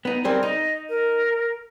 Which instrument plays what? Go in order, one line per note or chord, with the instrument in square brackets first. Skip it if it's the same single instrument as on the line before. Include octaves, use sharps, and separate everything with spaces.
[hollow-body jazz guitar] B3 D#4
[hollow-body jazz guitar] G3 C4 G#4 [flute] A#4
[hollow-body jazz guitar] D#4 [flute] D#5
[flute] A#4